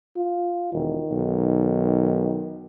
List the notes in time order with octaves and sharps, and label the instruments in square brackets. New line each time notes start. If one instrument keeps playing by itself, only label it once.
[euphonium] F4
[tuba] E1 [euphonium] D#3
[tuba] B1